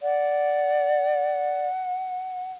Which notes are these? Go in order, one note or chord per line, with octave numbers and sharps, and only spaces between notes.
D5 F#5